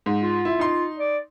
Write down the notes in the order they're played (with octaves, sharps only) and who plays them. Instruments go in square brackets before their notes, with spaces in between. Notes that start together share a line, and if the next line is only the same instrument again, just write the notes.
[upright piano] G#2
[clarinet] F4
[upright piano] E4
D#4 C6
[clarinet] D5